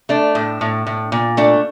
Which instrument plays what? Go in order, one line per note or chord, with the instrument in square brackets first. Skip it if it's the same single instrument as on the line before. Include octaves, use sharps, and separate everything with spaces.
[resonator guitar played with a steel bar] A3 D4
A2
A2
A2
A#2
A3 D4